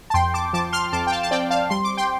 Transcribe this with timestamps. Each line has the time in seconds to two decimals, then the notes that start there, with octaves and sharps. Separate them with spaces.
0.10 A5
0.14 F2 G5 C6
0.34 A5 D6
0.53 F3 A5 D6
0.72 C6 F6
0.93 F2 A5 D6
1.07 G5
1.12 F5 A5
1.23 A5
1.31 C4 D5 G5
1.51 F5 A5
1.70 G3 C6
1.84 D6
1.97 G5 C6